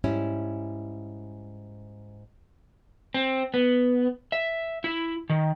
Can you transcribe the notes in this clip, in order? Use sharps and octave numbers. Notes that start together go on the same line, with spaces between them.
G#2 G3 C#4 E4
C4
B3
E5
E4
D#3